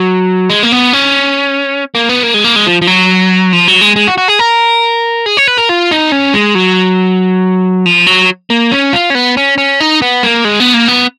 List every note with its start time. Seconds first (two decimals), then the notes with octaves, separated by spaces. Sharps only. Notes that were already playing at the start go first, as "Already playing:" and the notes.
Already playing: F#3
0.50 G#3
0.63 A#3
0.72 B3
0.93 C#4
1.95 A#3
2.09 B3
2.23 A#3
2.34 G#3
2.44 A#3
2.56 G#3
2.66 F3
2.82 F3
2.87 F#3
3.53 F3
3.68 F#3
3.81 G#3
3.96 G#3
4.07 F#4
4.18 F#4
4.28 G#4
4.39 A#4
5.26 G#4
5.37 C#5
5.48 B4
5.58 A#4
5.69 F4
5.91 D#4
6.12 C#4
6.34 G#3
6.55 F#3
7.86 F3
8.07 F#3
8.50 A#3
8.72 C#4
8.93 F4
9.10 C#4
9.15 B3
9.37 C#4
9.58 C#4
9.80 D#4
10.02 B3
10.23 A#3
10.45 G#3
10.60 B3
10.74 A#3
10.88 B3